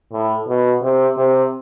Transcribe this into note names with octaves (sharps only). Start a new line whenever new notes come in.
A2
B2
C3
C3